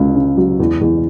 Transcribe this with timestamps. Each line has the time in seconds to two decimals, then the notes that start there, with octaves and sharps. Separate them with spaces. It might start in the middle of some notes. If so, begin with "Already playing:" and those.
Already playing: C#2 C#3
0.15 C#3
0.38 F#3
0.60 E2
0.81 E2